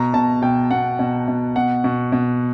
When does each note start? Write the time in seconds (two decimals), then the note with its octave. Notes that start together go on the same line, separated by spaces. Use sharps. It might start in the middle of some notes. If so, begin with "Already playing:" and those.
Already playing: B2 A#5
0.14 B2 A5
0.42 B2 G5
0.71 B2 F#5
0.99 B2
1.28 B2
1.56 B2 F#5
1.84 B2
2.12 B2